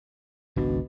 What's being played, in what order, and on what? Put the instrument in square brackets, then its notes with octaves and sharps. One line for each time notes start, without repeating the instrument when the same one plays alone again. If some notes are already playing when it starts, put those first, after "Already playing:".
[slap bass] G#1 C#2 D4 [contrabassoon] B2